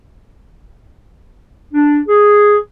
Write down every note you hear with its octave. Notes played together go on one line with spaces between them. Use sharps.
D4
G#4